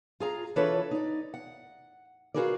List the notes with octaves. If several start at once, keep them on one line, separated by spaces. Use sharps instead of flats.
F4 G#4 A#5
E3 D4 F4 A4 B4 C#5
D#4 D5
F#5
F4 F#4 G#4 A#4 B4 D5